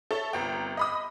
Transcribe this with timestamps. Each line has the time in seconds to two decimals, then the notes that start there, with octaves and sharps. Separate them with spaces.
0.11 A4 C#5 E5 A5
0.33 G1 C2 G5
0.77 D#5 B5 D#6